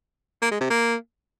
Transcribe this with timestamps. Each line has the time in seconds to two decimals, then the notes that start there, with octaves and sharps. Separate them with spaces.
0.42 A#3
0.51 G#3
0.61 C3
0.70 A#3